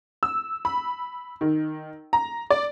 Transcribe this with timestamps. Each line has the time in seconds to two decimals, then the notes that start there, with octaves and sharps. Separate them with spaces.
0.23 E6
0.65 B5
1.41 D#3
2.13 A#5
2.50 D5